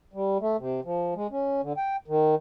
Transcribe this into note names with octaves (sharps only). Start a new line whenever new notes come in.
G3
A3
C3
F3
G#3
C#4
D3
G5
D#3